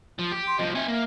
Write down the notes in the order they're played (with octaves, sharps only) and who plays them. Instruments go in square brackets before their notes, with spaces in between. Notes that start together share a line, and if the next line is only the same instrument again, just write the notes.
[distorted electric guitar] F3
G4
[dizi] C6
[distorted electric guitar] C2 F3 [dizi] D#5
[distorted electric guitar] C4 G#5 [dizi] E5
[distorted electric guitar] A#3